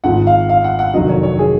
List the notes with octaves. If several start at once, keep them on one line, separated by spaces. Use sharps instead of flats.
G#1 G#2 F3 F#5
F5
F5
F#5
F#5
F1 F2 D#3 F#3 D#5
C#5
C#5
G#4